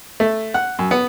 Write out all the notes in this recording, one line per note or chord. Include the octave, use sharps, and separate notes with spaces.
A3
F#5
F#2
B3